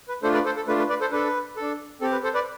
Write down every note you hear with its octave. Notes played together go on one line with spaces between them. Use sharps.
B4
A3 D4 F4 A4 C5
B4 D5
A4 C5
A4
A3 D4 F4 B4
B4
B4 D5
A4 C5
D4 A4 B4
D4 A4
C4 G4 A4
B4
A4 C5
B4 D5